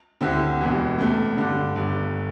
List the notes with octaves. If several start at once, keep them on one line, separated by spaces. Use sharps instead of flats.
D2 D3 C4 E4 G4
E1 E2 E3 G3
E2 C3 A3
G2 D3 G3 D4
G1 G2 G3